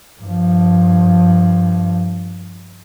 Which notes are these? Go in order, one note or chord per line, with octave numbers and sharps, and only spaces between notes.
G2 F3